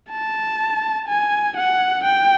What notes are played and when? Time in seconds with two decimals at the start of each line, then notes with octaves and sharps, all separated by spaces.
0.11 A5
1.08 G#5
1.57 F#5
2.04 G5